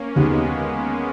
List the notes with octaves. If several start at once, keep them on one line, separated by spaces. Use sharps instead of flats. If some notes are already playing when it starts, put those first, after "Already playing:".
Already playing: A#3 C#4
D#2 G#3 B3